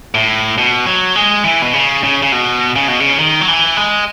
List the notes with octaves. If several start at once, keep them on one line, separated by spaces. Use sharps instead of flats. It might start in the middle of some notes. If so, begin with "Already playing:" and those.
A2
B2
F#3
G#3
E3
B2
C#3
C#3
C#3
B2
C#3
B2
C#3
D#3
F#3
E3
G#3